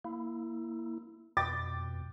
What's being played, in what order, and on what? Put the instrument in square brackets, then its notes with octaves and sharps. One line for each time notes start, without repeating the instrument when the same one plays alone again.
[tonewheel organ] A#3 E4
[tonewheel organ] F2 B2 [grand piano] G5 D6 A6